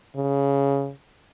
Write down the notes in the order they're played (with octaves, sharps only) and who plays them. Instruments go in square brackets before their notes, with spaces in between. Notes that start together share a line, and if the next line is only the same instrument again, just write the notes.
[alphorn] C#3